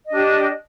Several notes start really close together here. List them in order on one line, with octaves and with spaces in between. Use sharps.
D#5 D4 G4